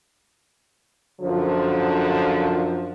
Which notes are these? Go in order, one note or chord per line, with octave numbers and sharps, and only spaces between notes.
F#2 D3 F3